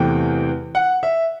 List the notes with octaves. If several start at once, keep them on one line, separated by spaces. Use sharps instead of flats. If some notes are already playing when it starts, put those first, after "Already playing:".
Already playing: E2 C3 E3 A3 G5
F#5
E5